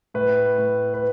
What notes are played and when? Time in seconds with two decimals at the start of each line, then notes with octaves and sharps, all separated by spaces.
0.14 A2 B4
0.58 A2
0.94 B4